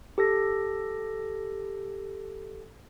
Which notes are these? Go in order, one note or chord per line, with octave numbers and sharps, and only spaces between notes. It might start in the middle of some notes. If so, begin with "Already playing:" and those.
G4 A4 A#6